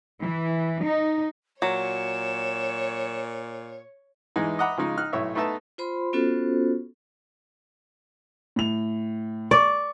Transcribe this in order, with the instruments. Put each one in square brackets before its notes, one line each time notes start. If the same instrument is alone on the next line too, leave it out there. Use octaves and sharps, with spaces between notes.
[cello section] E3
D#4
[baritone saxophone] A#2 [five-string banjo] F#3 [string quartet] C#5 [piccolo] E7
[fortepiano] E2 E3 G#3 D#4
D#5 E5 F#5 A#5 B5 D6
C#3 F3 G#3 D#4
D#4 F6 F#6
B1 A2 C#5 E5
A3 B3 D#4 E5 A5
[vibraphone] F4 C5 B5 C6
B3 C#4 F4 F#4 A4 C5
[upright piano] A2 F7
[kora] D5 [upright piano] C#6